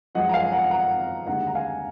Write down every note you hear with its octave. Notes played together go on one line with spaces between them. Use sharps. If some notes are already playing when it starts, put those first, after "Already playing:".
F#2 F3 G#3 D#5 F#5
A#5
F5 G#5
F#5 A#5
F#5 A#5
D#2 D3 G#3 F#5 A#5
A#5
F5 G#5